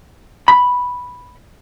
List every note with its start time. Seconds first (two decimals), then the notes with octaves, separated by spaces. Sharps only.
0.48 B5